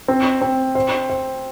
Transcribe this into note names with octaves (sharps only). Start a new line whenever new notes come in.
C4
C4
C5
C5